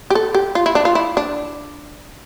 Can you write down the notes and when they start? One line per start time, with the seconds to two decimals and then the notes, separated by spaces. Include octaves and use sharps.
0.10 G4
0.15 A4
0.34 G4
0.55 F4
0.66 E4
0.75 D4
0.85 F4
0.95 E4
1.17 D4